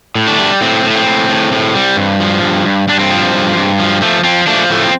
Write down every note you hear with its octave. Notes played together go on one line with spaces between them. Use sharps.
A2
A3 D4
G3
A2 C4
A2
A3
C4
A2
A2
A2
G3
G2
F3
G2
G2
G2 D4
C4
F3
G2
G2
F3
F3 A3
F3 C4
F3 A3 D4
A2 A3
C4